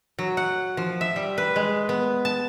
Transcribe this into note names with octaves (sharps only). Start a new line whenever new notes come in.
F#3
F#5
F3
E5
G3
B4
G#3
B3
A5